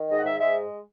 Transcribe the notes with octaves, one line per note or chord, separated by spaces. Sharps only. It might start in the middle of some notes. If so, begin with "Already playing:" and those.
Already playing: D#3
G#2 D#5
F#5
G#2 E5
G#3 E5